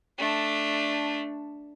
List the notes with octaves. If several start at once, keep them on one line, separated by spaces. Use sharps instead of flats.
A3 D4